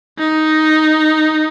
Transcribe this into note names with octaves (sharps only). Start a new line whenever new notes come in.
D#4